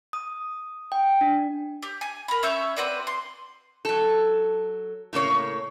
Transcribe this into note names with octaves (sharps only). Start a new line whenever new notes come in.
D#6
G5
D4
G4
G#5
A#4 B5
C#4 E5 C#6 G6
C4 F#4 B4 D5
C6
F#3 A4
A2 C#3 A#3 C#5